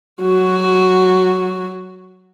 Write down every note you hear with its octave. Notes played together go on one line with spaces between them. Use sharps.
F#3 F#4